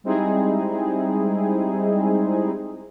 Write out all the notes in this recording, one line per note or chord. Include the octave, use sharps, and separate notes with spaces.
G3 G#3 C4 D#4 E4 G#4